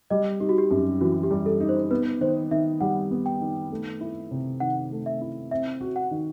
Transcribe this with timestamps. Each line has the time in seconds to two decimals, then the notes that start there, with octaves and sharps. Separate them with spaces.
0.10 G3 D#5
0.40 D#4 G4
0.49 F#4
0.58 G4
0.71 F#2 G4
1.01 E3 F#4
1.23 G4
1.31 G3
1.46 A4
1.60 D#4
1.69 C5
1.90 B3 B4
2.21 D#3 C5
2.51 D#3 E5
2.81 G3 F#5
3.11 B3
3.26 G5
3.41 D#3
3.71 A3
4.01 E4
4.31 C3
4.60 D#3 F#5
4.91 A3
5.06 E5
5.21 E4
5.51 C4 E5
5.81 F#4
5.96 F#5
6.11 D#3